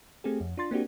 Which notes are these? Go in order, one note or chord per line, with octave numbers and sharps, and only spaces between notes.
A3 C4 G4 G#4
F2
D4 F4 C6 A6
A#3 C4 D4 F#4 G4